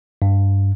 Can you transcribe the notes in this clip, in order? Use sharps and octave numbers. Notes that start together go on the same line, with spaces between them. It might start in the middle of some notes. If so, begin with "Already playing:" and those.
G2